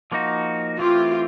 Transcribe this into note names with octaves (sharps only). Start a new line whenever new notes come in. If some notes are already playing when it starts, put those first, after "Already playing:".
F3 A#3 D#4 F#4
E3 A3 C4 E4 F4 G4